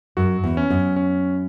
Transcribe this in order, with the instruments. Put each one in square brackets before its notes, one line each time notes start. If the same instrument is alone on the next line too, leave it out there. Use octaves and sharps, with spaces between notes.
[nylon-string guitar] F#2 [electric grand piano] F#4
[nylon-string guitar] E2
[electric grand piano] C#4
[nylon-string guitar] F#2
[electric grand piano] C#4